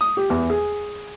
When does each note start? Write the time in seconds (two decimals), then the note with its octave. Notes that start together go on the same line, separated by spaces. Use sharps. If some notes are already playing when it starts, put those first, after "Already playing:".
0.01 D#6
0.17 G4
0.30 E2
0.50 G#4